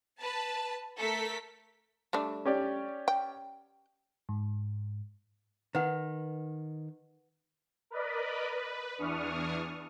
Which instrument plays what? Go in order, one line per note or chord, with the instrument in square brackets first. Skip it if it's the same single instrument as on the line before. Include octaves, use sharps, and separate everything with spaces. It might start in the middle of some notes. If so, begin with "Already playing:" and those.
[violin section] B4 A5
A3 A4 A#4 B6
[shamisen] G3 A3 D4
[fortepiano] C#4 G4 D5
[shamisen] G5
[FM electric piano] G#2
[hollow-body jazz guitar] D#3 [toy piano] B4 F#5
[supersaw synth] A#4 B4 D5 D#5 B5
B4
E2 E3 D4 C#6 D#6 F6